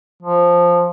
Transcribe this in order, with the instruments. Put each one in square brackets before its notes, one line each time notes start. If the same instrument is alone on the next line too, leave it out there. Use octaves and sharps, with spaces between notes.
[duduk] F3